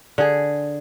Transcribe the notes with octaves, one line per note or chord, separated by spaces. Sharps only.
D3 G#4